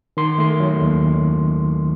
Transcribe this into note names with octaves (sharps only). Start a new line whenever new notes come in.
D#3 C6
A3 C6
F#3
D#2